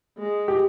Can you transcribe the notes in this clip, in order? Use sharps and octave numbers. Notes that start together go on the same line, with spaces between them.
G#3
G4